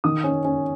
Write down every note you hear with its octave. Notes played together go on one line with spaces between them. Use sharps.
D#3 D#6
C#4
C#4